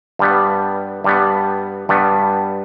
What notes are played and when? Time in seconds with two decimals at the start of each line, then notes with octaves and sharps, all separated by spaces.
0.19 G2 G3 B3
1.04 G2 G3 B3
1.89 G2 G3 B3